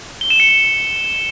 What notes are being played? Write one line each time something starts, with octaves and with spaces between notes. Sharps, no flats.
G7
E7
C#7
E7